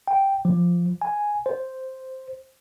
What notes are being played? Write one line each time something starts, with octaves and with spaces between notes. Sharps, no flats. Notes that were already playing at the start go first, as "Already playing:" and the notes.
G5
F3
G#5
C5